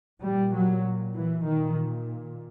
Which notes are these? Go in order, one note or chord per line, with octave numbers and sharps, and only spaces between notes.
A#2 G3
F#3
E3
A#2 D#3